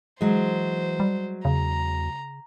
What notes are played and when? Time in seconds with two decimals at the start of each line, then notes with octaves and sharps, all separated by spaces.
0.21 E3 F#3 G#3 C5
1.00 G3
1.45 E2 C#3 A#5